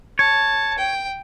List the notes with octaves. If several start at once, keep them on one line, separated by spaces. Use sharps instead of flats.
C#5 A5
G5